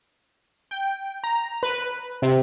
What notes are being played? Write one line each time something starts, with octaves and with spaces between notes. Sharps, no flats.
G5
A#5
B4
C3